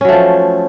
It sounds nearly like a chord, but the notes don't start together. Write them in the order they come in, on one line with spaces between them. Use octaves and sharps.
C#4 F#3 A3 F3